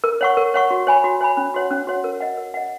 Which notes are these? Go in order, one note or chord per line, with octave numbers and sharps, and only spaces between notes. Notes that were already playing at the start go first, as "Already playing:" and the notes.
A#4
C#5 F#5 C#6
A#4
C#5 F#5 C#6
F#4
C#5 G#5 B5
F#4
C#5 G#5 B5
C#4
F#4 C#5 F#5
C#4
F#4 C#5 F#5
A#4
D#5 F#5
A#4
D#5 F#5